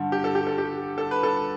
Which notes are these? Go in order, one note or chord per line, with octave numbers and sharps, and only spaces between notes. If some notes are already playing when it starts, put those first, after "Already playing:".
Already playing: G2 D3
G4
A4
G4
A4
G4
A4
B4
A4